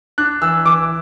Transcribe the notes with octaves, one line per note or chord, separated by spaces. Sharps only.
D4 F#6
E3 E6
E3 D6